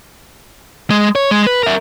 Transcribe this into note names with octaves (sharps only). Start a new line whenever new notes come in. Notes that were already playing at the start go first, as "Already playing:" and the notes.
G#3
C#5
G#3
B4
A#4 E5